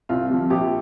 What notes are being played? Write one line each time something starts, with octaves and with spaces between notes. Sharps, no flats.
C2 F4
C3 F3
A#1 G4